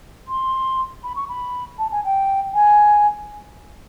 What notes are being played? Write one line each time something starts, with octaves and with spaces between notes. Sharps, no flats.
C6
B5
C#6
B5
A5
G#5
G5
G#5